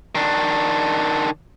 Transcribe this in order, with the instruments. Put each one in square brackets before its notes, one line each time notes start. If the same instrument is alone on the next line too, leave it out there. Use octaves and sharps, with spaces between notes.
[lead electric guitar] D#3 D4